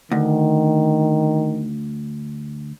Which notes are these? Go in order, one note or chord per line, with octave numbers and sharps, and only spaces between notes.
D2 D#3